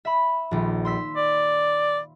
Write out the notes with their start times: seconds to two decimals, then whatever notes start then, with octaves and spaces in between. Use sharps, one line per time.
0.05 E5 B5
0.51 D#1 A#1
0.85 C6 E6 B6
1.16 D5